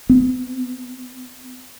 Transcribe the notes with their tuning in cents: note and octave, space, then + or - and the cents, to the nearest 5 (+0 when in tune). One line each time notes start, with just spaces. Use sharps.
B3 +45